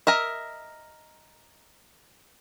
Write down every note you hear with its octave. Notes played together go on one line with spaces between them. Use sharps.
A#4 D#5 E5